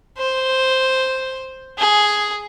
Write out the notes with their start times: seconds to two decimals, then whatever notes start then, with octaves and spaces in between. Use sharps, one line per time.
0.18 C5
1.78 G#4